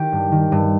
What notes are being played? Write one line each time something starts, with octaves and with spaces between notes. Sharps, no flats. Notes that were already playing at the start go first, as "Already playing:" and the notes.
Already playing: D#3 G4
G2
D#3
G2